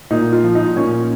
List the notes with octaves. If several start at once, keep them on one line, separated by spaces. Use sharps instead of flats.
A#2 D#4
F4
F3
D#4
A#2 C#4